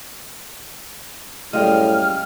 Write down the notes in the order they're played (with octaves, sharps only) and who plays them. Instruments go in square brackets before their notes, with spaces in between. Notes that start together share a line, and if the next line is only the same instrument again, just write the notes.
[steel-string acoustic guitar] F#2 G3 G#3 [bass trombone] A2 [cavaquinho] D#5 F5 G5 [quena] F6